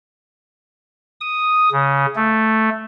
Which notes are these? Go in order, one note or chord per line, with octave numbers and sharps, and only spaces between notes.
D#6
C#3
A3